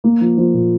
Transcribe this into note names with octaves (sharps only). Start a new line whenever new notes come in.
A#3
F3
F3
A#2